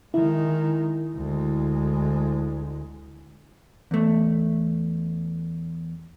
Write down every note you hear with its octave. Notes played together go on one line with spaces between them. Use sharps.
D#3 G#3 E4
D2 G#3
E2 A3